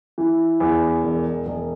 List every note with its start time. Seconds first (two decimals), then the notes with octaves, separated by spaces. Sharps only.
0.18 E3
0.60 E2
1.03 E1
1.46 E1